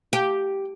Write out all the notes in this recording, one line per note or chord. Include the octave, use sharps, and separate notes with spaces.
G4